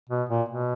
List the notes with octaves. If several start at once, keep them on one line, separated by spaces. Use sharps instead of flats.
B2
A#2
B2